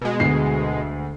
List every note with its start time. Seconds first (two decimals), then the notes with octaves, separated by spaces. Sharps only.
0.01 B2 G#3
0.20 D2 C7